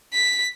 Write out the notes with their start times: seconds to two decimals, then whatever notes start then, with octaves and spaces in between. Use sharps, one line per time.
0.14 B6